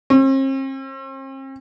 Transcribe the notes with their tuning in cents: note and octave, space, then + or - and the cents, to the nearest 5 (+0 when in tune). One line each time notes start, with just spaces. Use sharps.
C4 +45